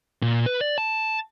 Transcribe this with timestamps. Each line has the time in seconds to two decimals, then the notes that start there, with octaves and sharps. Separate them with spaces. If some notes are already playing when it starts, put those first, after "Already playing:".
0.22 A#2
0.46 B4
0.61 D5
0.78 A5